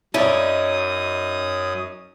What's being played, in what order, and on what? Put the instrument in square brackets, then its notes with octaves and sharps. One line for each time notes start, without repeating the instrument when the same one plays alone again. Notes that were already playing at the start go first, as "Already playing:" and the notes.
[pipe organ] F#2 D#6 [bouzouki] C#4 D#4 [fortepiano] E4 D5